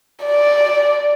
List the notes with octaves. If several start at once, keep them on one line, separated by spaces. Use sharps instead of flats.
D5